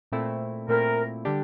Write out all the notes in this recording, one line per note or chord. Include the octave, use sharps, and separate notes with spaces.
A#2 A3 C4 E4
A#2 A3 C4 E4 A#4
D3 G3 D4 G4